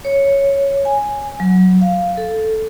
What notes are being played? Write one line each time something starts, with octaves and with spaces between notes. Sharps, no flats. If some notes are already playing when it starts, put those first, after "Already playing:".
C#5
G#5
F#3
F5
A4